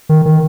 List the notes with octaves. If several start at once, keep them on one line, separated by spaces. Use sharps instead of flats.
D#3
D#3